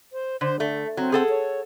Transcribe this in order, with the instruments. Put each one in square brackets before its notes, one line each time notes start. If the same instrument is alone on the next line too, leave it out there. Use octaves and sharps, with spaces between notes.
[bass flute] C5
[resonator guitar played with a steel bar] D3 [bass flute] C5
[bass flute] D3 [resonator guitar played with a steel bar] A3
[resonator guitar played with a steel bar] F#3 [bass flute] C4
[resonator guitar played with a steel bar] G#4 A4 F#5
[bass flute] C#5